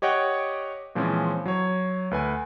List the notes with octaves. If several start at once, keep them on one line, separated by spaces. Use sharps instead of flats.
G4 C#5 D#5 F#5 G5
A#2 E3 F3 G#3 C4 C#4
F#3 C#5
D2 B4 G#5